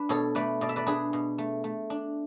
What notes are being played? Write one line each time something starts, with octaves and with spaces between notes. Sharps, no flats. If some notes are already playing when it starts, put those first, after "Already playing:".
Already playing: D4 B4
B2 A4 C#5
A3 B4 D5
B2 D5
E5
B4 D5
D4 G#4 B4
B2
A3
A3
D4